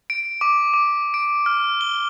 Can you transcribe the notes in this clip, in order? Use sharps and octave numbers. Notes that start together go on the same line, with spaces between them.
D7
D6
D6
D7
F6
G7